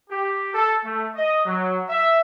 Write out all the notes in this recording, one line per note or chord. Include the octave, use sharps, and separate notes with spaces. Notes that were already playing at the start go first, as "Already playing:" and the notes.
G4
A4
A3
D#5
F#3
E5